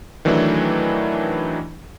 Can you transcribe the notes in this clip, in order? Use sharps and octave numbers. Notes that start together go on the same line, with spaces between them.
D#3 E3 F#3 A3 D4 E4